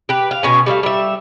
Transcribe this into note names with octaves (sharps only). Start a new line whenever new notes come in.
G4 B4
F5
B2 C#4 G#5
G3 A3 E5 F5
G3 E5